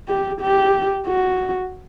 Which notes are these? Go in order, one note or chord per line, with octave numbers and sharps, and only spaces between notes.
G4
G4
F#4